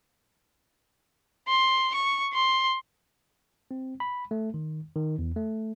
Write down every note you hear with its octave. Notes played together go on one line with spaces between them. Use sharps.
C6
C#6
C6
C4
B5
A3
D#3
D#3
E2
A3